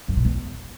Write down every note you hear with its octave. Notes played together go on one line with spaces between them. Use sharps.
F#2
A#2
E2